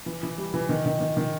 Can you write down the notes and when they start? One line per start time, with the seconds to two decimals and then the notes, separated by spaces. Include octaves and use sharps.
0.06 E3
0.23 E3
0.38 G3
0.54 E3
0.69 D#3
0.86 D#3
1.01 D#3
1.17 D#3